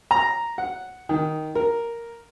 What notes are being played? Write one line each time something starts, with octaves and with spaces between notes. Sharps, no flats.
A#5
F#5
D#3
A#4